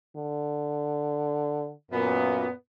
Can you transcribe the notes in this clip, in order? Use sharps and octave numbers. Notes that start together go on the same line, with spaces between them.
D3
F#2 A#2 B3